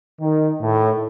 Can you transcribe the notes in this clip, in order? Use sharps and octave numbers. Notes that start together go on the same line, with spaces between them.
D#3
A2